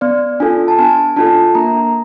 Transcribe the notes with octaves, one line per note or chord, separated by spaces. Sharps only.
B3 D5
D4 F4 A4 G#5
A5
B3 G#5
D4 F4 A4 A5
A#3 A#5